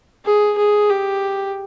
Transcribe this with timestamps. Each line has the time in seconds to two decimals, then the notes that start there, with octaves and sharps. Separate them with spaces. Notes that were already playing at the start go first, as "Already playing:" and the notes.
0.25 G#4
0.57 G#4
0.90 G4